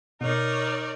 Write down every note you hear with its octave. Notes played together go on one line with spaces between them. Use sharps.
B2 D#4 A#4 C#5 D5